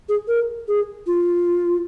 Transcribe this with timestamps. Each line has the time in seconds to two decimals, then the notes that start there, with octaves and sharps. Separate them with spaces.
0.09 G#4
0.28 A#4
0.68 G#4
1.07 F4